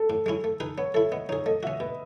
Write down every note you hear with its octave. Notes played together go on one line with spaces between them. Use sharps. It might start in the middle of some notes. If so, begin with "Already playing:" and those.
Already playing: A4
A2
G#3 C#4 E4
A3
D#4 G#4 B4
B3 C#5
E4 A4 E5
B3 D#5
D#4 G#4 C#5
A3 D#5
C#4 F#4 E5
B2 B4